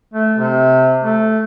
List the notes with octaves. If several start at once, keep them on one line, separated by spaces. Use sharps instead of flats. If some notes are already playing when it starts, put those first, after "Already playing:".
A3
C3
A3